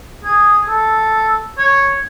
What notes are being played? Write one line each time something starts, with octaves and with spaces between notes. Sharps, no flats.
G#4
A4
C#5